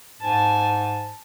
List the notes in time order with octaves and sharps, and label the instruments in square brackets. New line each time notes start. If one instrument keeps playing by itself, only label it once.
[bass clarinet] G#2 [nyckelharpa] G#5 A5